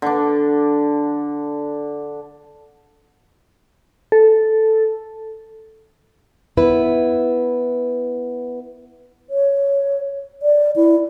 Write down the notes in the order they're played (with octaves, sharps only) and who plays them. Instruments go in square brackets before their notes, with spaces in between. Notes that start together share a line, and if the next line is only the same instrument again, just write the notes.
[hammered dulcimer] D3 D4
[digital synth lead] A4
[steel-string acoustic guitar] B3 E4 B4
[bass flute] C#5
D5
E4